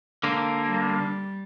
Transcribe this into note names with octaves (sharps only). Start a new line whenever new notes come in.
D3 A#3
G3